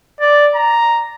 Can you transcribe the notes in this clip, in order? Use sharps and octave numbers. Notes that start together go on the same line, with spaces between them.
D5
A#5